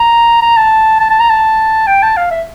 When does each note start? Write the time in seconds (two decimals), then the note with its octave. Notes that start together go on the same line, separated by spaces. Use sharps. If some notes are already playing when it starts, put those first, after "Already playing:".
Already playing: A#5
0.42 A#5
0.57 A5
1.00 A5
1.10 A5
1.20 A#5
1.30 A5
1.87 G5
2.02 A5
2.17 F5
2.31 E5